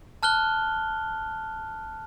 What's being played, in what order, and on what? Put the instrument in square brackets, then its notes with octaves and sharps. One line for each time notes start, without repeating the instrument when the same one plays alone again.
[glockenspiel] A5 F6 F#6 G7